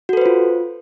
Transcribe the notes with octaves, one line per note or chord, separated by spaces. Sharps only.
F4 F#4 A4 B4 C5